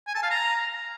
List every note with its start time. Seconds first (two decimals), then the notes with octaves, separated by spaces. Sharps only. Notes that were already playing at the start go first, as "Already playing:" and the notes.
0.07 G#5
0.15 A5
0.23 F5
0.31 A#5